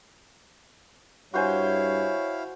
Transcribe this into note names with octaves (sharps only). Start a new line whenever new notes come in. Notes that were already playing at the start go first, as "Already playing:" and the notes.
G2 E4 F#4 C5 C#5 F5 G#5